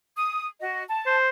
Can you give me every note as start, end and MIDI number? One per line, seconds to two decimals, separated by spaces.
0.17 0.46 87
0.60 0.83 66
0.60 0.83 75
0.89 1.16 81
1.06 1.29 72